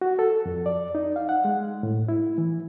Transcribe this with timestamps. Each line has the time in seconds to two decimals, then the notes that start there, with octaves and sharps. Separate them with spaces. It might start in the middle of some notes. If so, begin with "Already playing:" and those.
0.01 F#4
0.19 A4
0.46 F2
0.66 D5
0.95 D#4
1.16 F5
1.29 F#5
1.45 G#3
1.83 A2
2.08 E4
2.38 E3